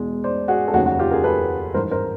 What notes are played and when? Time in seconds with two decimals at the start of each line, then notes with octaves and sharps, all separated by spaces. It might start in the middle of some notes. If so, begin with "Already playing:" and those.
Already playing: E2 B2 G#3
0.24 C5 D5
0.48 F#4 G#4
0.68 A4
0.73 F1 D#2 C#3 F#3 F#4 G#4
0.86 F#4
0.99 F4 G4
1.11 G#4 A#4
1.24 A4 B4
1.74 G#1 G2 E3 A#4 C5
1.91 A#4 C5